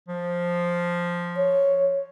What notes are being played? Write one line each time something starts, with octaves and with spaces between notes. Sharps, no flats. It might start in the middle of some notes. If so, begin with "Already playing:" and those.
F3
C#5